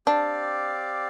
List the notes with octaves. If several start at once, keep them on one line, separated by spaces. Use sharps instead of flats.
C4 D4 G4 D5 F5